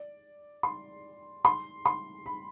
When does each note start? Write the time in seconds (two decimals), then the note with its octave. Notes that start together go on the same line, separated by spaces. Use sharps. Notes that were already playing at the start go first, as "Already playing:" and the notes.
Already playing: D5
0.63 C6
1.45 C6
1.86 C6
2.26 B5